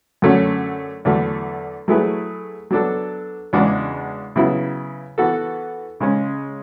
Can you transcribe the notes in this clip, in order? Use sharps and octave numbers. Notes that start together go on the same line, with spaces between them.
F#2 D3 F#3 A3 C#4
E2 D3 F#3 A3
F#3 A3 E4 G#4 B4
F#3 B3 D4 A4
E2 C#3 G#3 D4 F#4
C#3 F#3 B3 E4
E3 B3 F#4 A4
C#3 G#3 C#4